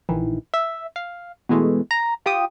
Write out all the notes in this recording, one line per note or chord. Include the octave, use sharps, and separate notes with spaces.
A#1 D#3 E3
E5
F5
B2 E3 G#3 A3
A#5
F4 G4 G5 D#6